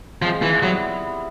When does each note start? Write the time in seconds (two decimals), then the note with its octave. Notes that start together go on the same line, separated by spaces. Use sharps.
0.21 F3 G#3 C4 F4
0.42 E3
0.63 F#3 G3 B3 E4